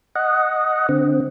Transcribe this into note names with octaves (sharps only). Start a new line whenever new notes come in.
D#5 F#5
D3 C4